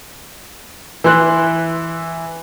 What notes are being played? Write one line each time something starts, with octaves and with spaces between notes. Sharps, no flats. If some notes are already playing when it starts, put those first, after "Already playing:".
E3 E4 C6 F#6